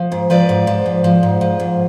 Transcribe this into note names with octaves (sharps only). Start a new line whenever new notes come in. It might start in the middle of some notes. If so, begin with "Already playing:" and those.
Already playing: F3
G#2
F3 B4 D5
G#2
F3
G#2
F3
G#2
F3
G#2